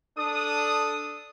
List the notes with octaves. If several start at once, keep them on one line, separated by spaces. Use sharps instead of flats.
D4 A4 D#6